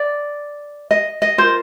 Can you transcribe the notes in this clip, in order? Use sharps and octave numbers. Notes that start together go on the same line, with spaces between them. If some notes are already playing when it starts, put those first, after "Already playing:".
Already playing: D5
D#5
D#5
F4 A#4 C5